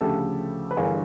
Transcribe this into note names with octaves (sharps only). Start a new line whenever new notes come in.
D2 C#3 F3 A3 G4 A4
B4
G1 G2 E3 G#4 A#4